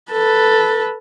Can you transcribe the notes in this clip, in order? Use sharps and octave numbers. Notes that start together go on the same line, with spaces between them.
A4 B4